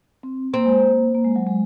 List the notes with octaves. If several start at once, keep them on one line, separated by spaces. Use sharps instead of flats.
C4
A#3 C4
G#3
A#3
A#3
G#3
F#3
G#3